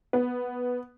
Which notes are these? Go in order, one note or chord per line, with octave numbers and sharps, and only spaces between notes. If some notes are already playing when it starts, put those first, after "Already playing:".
B3